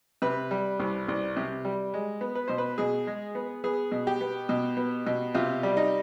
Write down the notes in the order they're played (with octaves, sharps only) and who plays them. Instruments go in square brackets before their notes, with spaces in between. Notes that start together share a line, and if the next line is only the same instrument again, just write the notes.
[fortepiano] C3 B4
G3
C2
C2
C3
G3
G#3
B3
B4
B2 C5
B4
B2 G#4
G#3
B3
B3 G#4
B2
G4
B3
B2
B3
B2
C3 F4
G3
D#4